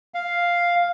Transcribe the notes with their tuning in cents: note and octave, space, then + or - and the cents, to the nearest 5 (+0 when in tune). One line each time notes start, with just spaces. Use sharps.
F5 +0